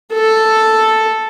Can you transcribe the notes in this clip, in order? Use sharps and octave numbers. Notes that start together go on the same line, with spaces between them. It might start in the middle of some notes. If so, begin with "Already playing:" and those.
A4